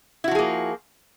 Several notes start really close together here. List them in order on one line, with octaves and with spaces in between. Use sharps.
E4 F#4 F3 G#4 A#3